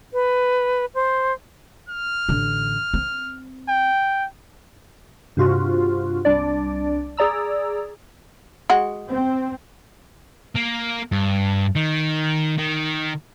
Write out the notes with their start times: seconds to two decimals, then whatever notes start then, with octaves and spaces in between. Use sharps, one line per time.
0.13 B4
0.95 C5
1.89 F6
2.29 A1 D3
2.94 C4
3.69 G5
5.37 G2 C3 F4 F#4
6.25 C2 D4 D5
7.17 G#4 D5 A#5 E6
8.70 G#3 F#4
9.08 C4
10.56 A#3
11.12 G2
11.76 D#3
12.58 D#3